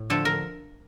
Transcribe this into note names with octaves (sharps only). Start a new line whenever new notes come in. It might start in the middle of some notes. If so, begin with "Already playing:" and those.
Already playing: A2
D3 F3 A3 A4
A#4